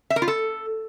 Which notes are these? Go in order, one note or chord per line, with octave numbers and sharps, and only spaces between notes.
E5
A#4
F4
A4